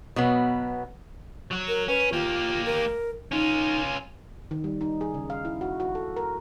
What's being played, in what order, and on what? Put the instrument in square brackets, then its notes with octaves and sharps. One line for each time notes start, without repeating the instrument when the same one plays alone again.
[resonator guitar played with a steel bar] B2 F#3 B3
[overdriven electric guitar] F#3 F#4
[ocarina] A#4
[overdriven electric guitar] C#4 [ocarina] B4
[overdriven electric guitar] A#3 G4 [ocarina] F4
[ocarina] A#4
[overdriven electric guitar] C#4 F4 [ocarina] D#4
[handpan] D#3
G3
D#4
G#4
C#3
F5
E4
F#4
F#4
A4
A#4